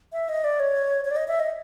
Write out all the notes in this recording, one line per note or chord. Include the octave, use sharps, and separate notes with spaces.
E5
D#5
D5
C#5
C#5
D5
D#5
E5
D#5